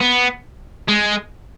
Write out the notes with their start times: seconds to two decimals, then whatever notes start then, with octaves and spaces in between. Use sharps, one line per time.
0.01 B3
0.89 G#3